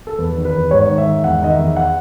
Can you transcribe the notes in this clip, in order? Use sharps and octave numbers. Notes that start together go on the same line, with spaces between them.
A4
E2 B4
D#3
B4
E2
G#2 C#5
D#3
E5
G#2
E2 F#5
D#3 D#5
E5
E2
F#5